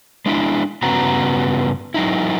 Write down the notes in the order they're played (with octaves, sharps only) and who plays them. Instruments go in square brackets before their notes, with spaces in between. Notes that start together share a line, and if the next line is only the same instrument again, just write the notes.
[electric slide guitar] G#3 D4 E4
G2 C#3 B3 F#4 A#5
F#3 D#4 E4